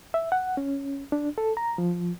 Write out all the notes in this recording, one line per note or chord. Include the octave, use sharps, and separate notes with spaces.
E5
F#5
C#4
D4
A4
A#5
F3